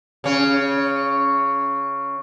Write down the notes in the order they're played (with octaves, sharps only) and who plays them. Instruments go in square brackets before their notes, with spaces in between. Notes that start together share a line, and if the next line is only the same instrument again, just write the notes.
[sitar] C#3 C#4